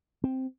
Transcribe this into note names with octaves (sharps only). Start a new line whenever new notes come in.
C4